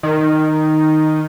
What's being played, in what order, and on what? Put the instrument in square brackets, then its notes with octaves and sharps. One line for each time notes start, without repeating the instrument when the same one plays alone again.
[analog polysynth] D#3